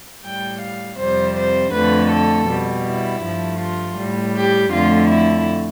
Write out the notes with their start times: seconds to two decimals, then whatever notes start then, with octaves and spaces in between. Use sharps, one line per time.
0.25 A2 G3 G5
0.62 F5
0.99 F2 C3 G3 C5
1.37 C5
1.74 F2 D3 A3 B4
2.11 A4
2.49 B2 G3
2.86 E4
3.24 G2 F3 A3
3.61 F4
3.98 A2 G3
4.36 G4
4.73 F2 D3 A3 F4
5.10 E4